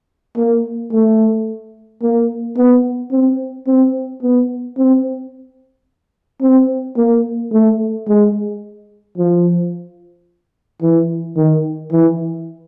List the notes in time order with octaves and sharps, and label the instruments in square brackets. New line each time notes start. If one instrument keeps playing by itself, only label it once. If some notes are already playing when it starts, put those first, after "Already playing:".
[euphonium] A#3
A3
A#3
B3
C4
C4
B3
C4
C4
A#3
A3
G#3
F3
E3
D#3
E3